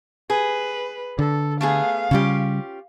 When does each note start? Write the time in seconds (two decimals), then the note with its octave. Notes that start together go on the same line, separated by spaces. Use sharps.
0.30 G#4 B4
1.19 D3 A4
1.61 A3 B3 G#4 F5
2.11 C#3 G3 C#4 F4 G4